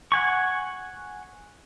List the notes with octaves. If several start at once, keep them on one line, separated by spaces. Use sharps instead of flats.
F#5 G#5 C#6